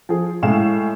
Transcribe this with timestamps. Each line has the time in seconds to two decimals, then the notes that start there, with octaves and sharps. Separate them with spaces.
0.09 F3 G#4
0.42 A2 G#3 E4 F5 G#5 E7